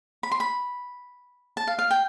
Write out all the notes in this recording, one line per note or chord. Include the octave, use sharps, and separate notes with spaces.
B5
C6
B5
A5
F5
F5
G5